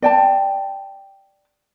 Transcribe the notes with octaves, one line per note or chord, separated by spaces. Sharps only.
D5 G5 A5